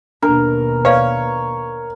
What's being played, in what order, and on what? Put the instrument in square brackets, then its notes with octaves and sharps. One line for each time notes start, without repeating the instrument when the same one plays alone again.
[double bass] D#2 B2 [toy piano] D4 [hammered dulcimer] A#4
[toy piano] B4 D5 F5 [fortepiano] C#5